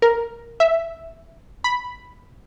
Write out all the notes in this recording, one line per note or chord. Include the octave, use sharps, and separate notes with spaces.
A#4
E5
B5